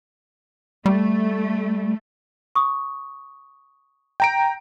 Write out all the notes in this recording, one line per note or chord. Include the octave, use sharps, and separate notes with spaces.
G3 A3
C#6 D#6
G5 A#5 D7